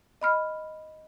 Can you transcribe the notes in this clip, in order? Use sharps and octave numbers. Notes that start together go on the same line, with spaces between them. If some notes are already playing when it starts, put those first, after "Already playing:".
D#5 B5 F6